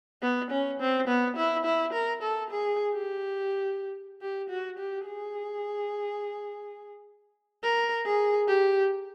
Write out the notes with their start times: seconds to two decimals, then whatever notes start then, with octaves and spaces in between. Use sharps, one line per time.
0.22 B3
0.51 C#4
0.80 C4
1.08 B3
1.37 E4
1.65 E4
1.93 A#4
2.22 A4
2.50 G#4
2.93 G4
4.22 G4
4.49 F#4
4.78 G4
5.06 G#4
7.63 A#4
8.06 G#4
8.48 G4